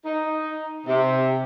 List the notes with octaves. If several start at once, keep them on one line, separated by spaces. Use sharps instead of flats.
D#4
C3